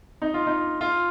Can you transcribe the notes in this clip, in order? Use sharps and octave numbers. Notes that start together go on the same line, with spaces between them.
D#4
F4
D#4
F4